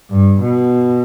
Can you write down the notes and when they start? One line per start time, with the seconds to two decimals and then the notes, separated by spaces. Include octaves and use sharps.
0.10 G2
0.40 B2